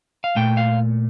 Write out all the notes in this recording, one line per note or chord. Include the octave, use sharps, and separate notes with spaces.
F5
A#2 A3 G5
F5